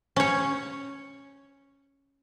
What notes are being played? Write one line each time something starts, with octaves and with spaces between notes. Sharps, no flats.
C#4 C#5